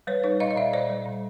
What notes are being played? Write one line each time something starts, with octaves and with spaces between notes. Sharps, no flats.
G3 B4 C#5
D#4 B4 C#5
A#2 D#5 F5
D#5
A#2 D5 E5
A#2 C5 D5
G3
A#2